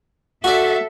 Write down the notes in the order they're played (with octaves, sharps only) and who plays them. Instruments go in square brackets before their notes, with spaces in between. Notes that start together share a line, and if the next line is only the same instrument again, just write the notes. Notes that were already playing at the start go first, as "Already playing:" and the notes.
[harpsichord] F#4 D5 [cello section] A4 E5